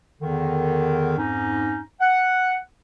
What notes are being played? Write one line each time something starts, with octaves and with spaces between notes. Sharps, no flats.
E2 D3 D#3
F2 G#2 C#4 D#4
F#5